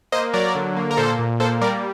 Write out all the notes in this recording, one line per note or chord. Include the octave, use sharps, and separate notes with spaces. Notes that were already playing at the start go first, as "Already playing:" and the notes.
A#3 C5 D#5
F#3 A#4 D5
D3
A#3
A#4
A#2 A4 C5
A#2
A#3 A4 C5
G3 A#4 D5